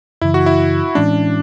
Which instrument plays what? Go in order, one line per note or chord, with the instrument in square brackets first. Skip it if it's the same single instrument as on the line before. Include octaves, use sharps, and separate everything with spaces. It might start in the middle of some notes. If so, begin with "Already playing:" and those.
[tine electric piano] F#2 C#3 E3 [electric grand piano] E4
[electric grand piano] F#4
E4
[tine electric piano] A2 E3 G#3 C#4 [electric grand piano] D4